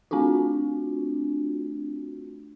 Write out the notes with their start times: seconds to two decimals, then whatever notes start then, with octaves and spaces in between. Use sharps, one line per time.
0.11 A3 C4 D4 F4 F#4